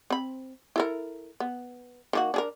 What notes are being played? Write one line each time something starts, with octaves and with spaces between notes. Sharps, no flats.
C4 B5
E4 A4 A#4
B3
D#3 A#3 F#4
D4 G#4 A#4